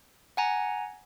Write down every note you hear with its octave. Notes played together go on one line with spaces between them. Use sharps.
F#5 G#5 A#5